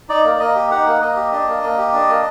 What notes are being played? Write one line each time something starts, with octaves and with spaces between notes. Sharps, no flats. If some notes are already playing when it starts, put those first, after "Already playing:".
D#4 D5
A#3
D5
A#3 D#5
G4
D#4 F#5
A#3
A#3 D#5
G4
D4 D#5
A#3
A#3
G4
D4
A#3